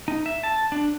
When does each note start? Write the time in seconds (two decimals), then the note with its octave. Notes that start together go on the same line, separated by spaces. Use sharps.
0.08 D#4
0.26 E5
0.43 A5
0.72 D4